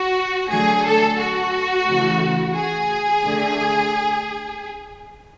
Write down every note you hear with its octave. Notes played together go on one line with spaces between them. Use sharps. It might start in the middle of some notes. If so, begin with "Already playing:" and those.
Already playing: F#4
D3 F#3 A3 G#4
A4
F#4
C#3 E3 A3
G#4
D3 A3